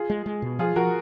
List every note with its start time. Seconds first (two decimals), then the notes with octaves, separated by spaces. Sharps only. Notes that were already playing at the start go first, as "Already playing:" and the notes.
Already playing: F4 G#4
0.10 G#3
0.26 G#3
0.42 B2
0.59 F3 F4 G#4
0.76 F3 F#4 A#4